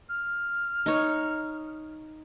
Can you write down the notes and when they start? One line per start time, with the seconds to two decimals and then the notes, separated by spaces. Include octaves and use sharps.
0.09 F6
0.86 D#4 C#5